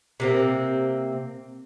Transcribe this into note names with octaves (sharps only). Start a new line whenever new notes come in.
C3 A#3 C4